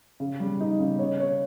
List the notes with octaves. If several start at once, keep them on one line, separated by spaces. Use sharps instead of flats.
C#3
G3
D#4
C#3
C#5
C#5